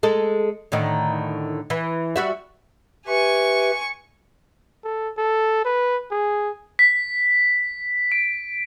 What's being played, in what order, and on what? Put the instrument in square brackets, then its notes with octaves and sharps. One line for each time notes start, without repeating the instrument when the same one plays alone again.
[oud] G#3 A4
A2 D3 D#3
E3
G3 F#4 E5
[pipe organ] G4 B4 E5 [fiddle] G#5 C#6
[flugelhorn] A4
A4
B4
G#4
[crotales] B6
D7